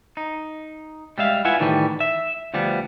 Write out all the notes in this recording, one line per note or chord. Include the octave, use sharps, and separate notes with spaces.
D#4
G3 G#3 E5 F5
E4 F4 B4 E5 F#5 G#5
A2 D#3 E3 G3
E5
D2 F3 G3 B3